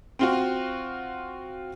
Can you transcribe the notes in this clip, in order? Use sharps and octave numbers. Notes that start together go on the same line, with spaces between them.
C4 F4 F#4